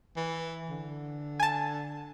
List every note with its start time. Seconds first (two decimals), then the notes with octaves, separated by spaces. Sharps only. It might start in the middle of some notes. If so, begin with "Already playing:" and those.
0.17 E3
0.70 D3
1.40 G#5 A5